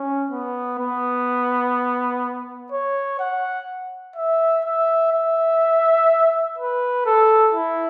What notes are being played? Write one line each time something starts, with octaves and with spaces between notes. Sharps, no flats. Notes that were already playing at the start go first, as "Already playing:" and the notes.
Already playing: C#4
B3
B3
C#5
F#5
E5
E5
E5
B4
A4
E4